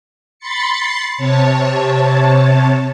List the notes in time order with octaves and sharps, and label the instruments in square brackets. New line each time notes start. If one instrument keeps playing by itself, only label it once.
[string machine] B5 C6 A6 C7 C#7
C3 C#5 A5